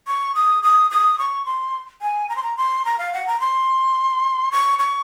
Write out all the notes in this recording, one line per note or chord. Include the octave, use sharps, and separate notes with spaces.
C#6
D#6
D#6
D#6
C#6
C6
G#5
A#5
C6
A#5
C6
A#5
F5
F#5
A#5
C6
C#6
C#6